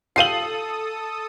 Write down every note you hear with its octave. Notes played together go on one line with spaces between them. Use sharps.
F4 G4 A4 F5 D#6 C7 D#7 F#7